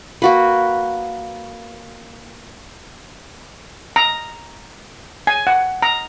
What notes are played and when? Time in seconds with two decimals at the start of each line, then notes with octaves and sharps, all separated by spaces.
0.22 A#3 F#4 B4
3.96 A#5
5.27 G#5
5.47 F#5
5.82 A#5